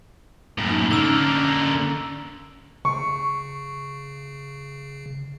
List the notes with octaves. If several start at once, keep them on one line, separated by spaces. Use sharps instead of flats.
F#2 A2 A#3
D#4
D3 A#3 C#4 A#5 E6
C#3 C#6